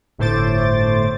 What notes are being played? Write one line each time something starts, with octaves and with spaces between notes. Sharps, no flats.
G1 A2 A3 C5 D6 A6